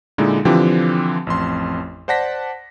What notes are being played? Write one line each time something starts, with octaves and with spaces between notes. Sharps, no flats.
A#2 D3 G#3 D#4 E4
D3 E3 F3 C4 F4 G4
A1 F2 C6
C5 D5 F#5 A5 A#6 B6